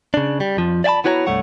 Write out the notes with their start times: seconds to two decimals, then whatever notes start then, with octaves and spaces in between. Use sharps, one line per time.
0.14 C#3 D4
0.40 G3
0.57 F2 F3
0.84 D5 E5 G#5 A5 B5
1.04 B3 E4 F#4 C#5 F#5 A#5
1.27 C2 G2 A3 C#5 F#5